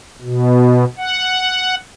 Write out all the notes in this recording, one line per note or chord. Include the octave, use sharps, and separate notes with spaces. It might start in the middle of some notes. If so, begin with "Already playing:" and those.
B2
F#5